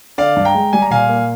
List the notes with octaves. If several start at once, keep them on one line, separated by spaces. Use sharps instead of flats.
D3 D5 F5
G2
G5 A#5
G#3
G3 G#5
A#5
A#2 F5 G#5
A#3